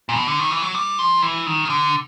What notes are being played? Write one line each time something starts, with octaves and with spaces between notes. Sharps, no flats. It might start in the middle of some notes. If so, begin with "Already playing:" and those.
A#2
B2
D3
D#3
E3
F#3
G3
F3
E3
D#3
C#3
D3